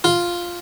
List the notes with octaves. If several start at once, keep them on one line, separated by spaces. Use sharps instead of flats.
F4